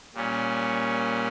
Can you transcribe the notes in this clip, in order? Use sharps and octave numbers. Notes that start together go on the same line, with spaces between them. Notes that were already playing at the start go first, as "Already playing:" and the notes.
A#2 G3 C#4